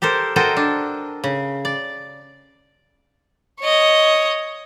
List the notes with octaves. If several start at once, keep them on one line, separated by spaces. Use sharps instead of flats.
G4 A4 A#4 C5
F#4 A4 A#4 C5 D#5 G5
D4
C#3
D5
C#5 D#5